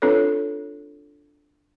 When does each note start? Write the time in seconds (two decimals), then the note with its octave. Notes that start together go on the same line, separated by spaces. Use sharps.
0.02 C4 D4 F4 A4 B4 C#5